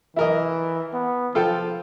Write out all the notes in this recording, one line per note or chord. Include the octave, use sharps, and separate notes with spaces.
E3 E4 A#4 D#5
B3
F3 F4 A4 G5